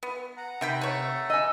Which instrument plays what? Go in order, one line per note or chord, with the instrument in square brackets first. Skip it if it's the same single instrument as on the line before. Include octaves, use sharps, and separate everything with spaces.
[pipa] B3
[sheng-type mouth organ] F#5 A#5
[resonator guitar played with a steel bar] C3 [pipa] D#3 G5 B5
[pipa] A3 C#5
[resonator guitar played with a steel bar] D#5 G#5 [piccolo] E6